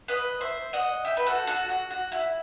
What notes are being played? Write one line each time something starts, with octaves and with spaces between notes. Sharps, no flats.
B4 D#5
C5 E5
D#5 F#5
E5 G5
B4
F#4 A4
F#4 A4
F#4
F#4
E4